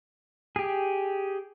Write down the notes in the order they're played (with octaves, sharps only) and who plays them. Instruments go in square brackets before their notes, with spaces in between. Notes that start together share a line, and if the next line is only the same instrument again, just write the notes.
[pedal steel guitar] G4 G#4